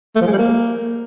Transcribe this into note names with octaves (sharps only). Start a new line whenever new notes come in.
A3
F3
G#3
G3
A#3